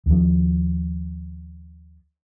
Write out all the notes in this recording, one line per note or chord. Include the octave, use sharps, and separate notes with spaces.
D#2 F3